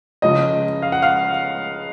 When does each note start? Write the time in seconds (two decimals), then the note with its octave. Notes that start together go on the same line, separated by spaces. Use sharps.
0.22 C#2 C#3 F3 D#5
0.82 F5
0.92 F#5
1.02 F5